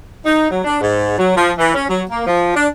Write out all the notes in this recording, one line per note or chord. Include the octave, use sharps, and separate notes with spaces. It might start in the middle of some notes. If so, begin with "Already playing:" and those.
D#4
F#3
D4
G#2
F#3
F3
E3
C#4
F#3
A#3
F3
D4